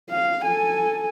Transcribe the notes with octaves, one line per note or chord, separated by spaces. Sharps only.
F5
A4 G#5